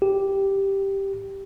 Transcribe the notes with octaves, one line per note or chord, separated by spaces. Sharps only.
G4